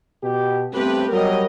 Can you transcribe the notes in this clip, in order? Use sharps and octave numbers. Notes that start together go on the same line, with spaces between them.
B2 G4
G2 A3 B3 C4 G4 B4
F#3 G3 A#4 D#5